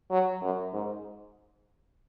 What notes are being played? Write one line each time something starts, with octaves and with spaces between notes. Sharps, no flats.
F#3
F#2
G#2